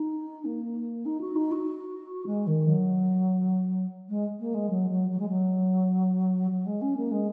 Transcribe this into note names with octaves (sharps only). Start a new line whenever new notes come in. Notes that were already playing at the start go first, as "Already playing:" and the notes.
Already playing: D#4
A#3
D#4
F#4
D#4
F#4
G#3
D#3
F#3
G#3
A#3
G#3
F#3
F#3
F#3
G#3
F#3
F#3
G#3
C#4
A#3
G#3